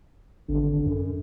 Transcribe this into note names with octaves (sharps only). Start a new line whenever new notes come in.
G#1 D3
F#2